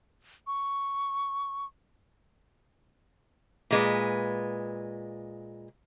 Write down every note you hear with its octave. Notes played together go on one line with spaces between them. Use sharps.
C#6
A#2 G#3 B4